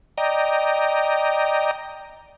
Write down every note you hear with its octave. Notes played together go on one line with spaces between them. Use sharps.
D5 D#5 G5 A#5